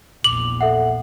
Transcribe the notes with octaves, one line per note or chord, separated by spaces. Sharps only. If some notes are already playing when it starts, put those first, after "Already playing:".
A#1 E2 D6 F7 F#7
A4 E5 F#5